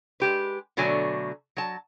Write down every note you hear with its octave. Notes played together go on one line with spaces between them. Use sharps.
G#3 G4 B4
B2 D3 F#3 A3 G#5
F#3 A5